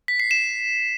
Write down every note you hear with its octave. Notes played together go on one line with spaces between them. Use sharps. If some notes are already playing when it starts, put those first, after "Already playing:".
B6
C7
E7